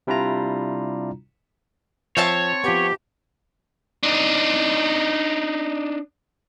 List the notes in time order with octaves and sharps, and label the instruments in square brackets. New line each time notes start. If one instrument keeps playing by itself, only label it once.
[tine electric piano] C3 G3 D4 E4 F4 A#5
[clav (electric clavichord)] F3 [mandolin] C4 E5 A5 [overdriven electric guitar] C#5
[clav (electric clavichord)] F3 B3 [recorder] G4
[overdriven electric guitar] D4 D#4